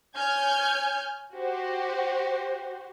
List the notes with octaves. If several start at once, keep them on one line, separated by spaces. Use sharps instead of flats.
C#5 G#5 F6 G6 G#6
F#4 G4 C5